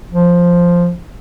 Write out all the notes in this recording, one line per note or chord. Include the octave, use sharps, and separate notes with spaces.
F3